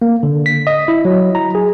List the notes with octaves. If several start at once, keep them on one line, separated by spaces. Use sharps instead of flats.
A#3
D3
B6
D#5
E4
F#3
A#5
G#4